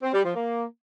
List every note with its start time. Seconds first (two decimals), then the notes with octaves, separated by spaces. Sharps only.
0.03 C4
0.14 G3
0.24 F3
0.35 A#3